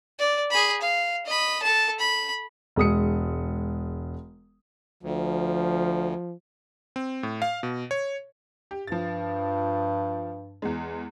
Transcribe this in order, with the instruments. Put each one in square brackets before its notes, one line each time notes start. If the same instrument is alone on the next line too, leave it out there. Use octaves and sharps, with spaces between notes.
[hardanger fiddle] D5
G#4 B5
F5
D#5 B5
A4 A5
B5
[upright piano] E1 G#3 D#6 C#7
[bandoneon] D2 [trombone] F3
[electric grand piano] C4
A2
F5
B2
C#5
[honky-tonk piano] G4
[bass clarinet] G2 [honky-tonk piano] F3 A6
[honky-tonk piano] E2 G#3